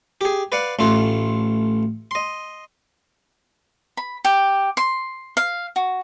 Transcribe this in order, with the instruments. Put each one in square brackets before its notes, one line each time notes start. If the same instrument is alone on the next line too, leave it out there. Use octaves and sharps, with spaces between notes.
[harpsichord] G4 G#4
B4 D5 F5 F#5
A1 A3 F4 C6
D#5 C6
[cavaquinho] B5
G4
C6
F5
F#4